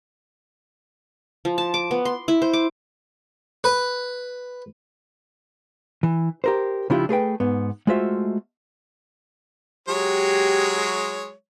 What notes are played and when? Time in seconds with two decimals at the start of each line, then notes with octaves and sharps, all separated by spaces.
1.45 F3
1.58 A5
1.74 D6
1.91 B3
2.05 C6
2.28 E4
2.42 C5
2.53 D6
3.64 B4
6.03 E3
6.44 G4 A#4 C5
6.90 C#3 F3 D4 E4 F4 G4
7.09 A3 G#4 B4 G5
7.40 G#2 B3
7.87 G#3 A3 F4 F#4 C5 E5
9.89 F#3 G#3 G4 C#5